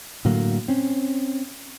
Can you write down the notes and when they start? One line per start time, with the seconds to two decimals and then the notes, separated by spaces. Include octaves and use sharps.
0.25 A2 D3 F#3 A#3
0.68 C4 C#4